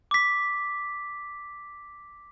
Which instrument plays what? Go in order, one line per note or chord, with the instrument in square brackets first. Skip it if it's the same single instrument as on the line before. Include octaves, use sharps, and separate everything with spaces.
[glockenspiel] D6 B6